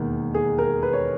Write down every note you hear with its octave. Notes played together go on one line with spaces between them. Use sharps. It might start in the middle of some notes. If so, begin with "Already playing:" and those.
Already playing: E1 D#2 D#3 F#5
G#4
A#4
B4
C#5